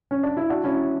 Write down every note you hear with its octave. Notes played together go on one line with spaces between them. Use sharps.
C#4
D4
E4
D4 F#4
C#4 E4